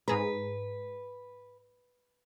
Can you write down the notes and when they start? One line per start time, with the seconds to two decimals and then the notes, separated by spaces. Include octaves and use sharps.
0.08 G#2 G#4 B4 A#5